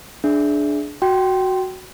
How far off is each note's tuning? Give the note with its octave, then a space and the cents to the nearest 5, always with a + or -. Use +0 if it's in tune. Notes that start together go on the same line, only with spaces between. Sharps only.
D4 +0 G#4 +20 E5 +0
F#4 +0 G5 -15 C6 +0